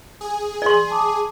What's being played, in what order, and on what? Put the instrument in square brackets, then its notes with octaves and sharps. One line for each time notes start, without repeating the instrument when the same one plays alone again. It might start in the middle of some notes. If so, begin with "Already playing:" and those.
[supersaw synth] G#4
[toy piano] D5 C6
[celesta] A5 D6 D#6